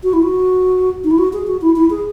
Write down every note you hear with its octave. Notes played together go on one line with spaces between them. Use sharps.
F#4
E4
F#4
D#4
E4
F#4
G#4
F#4
E4
E4
G#4